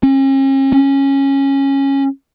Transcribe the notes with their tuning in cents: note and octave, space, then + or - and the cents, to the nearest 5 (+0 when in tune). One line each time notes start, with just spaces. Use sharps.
C#4 -45
C#4 -10